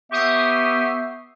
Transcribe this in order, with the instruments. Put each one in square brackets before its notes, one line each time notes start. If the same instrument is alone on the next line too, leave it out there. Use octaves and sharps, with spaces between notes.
[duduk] B3 [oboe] G4 [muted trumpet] E5 [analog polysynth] C#6 D#6 C7